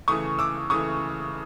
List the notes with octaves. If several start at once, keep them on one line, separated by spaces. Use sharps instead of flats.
C#3 E3 A3 C#6 D#6
D6 E6
C#3 E3 A3 C#6 D#6